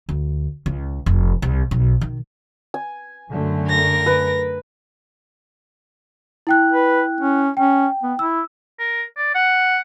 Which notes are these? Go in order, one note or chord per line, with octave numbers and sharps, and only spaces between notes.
D2
C#2
F1
C2
B1
D#3
G#5
F#2 D3 A3
A#4 A#6
B4
E4 G5 F#6
B4
C#4
C#4 G5
B3
E4 E6
A#4
D5
F#5